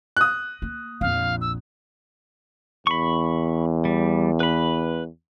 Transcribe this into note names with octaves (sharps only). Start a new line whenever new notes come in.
D#6 F#6
A#3
A#1 F2 F5
E6
E2 B5 C#6
G3
B4 B5